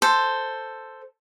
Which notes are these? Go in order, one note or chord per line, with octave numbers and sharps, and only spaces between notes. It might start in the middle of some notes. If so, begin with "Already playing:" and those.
A4 C5